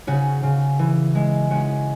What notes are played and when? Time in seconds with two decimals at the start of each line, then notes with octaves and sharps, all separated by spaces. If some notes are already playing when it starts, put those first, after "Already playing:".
0.07 C#3 C#4 F#4
0.43 C#3
0.79 E3
1.15 G#3
1.51 G#3 C#4 F#4